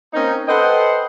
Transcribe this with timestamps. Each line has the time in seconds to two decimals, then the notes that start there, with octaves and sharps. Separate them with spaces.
0.14 A#3 C4 C#4 D#4
0.47 A4 B4 C5 D#5 F#5 G5